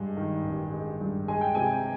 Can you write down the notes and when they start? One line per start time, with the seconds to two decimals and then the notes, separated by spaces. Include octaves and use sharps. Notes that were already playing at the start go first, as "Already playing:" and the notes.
Already playing: G2 G#3
0.17 D#3
0.44 A1
0.73 G#3
1.01 G2
1.28 G#3 G#5
1.41 G5
1.55 C3 G#5